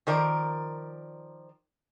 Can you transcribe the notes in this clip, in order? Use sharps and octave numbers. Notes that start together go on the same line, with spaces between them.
D#3 F3 A#4 D5